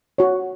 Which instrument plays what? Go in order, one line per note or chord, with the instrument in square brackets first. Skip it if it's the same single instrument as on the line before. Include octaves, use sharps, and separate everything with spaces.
[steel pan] F#4 C#5